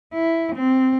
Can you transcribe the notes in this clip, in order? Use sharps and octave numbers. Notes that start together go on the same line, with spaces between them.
E4
C4